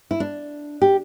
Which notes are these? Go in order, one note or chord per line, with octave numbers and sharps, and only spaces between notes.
E4
D4
G4